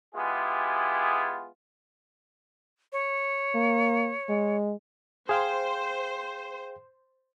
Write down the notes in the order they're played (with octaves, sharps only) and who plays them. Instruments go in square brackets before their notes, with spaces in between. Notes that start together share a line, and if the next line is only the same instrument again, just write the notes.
[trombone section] G#3 B3 E4 F4 G4 G#4
[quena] C#5
[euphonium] A#3
G#3
[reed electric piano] G#4 F5 G5 [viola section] C5